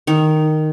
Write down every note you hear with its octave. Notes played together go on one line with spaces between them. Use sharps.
D#3